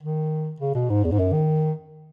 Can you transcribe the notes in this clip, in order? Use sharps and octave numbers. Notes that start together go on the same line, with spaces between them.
D#3
C#3
B2
G#2
E2
G#2
F#2
D#3